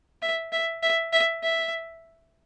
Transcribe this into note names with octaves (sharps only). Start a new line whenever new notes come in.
E5
E5
E5
E5
E5